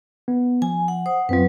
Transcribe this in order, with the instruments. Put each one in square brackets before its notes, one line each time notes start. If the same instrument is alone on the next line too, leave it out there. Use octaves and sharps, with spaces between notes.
[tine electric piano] B3
[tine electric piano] F3 [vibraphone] G#5
[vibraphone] F#5
C5 F#5 D#6
[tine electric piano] F#2 C4 F4 [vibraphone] F#3 B4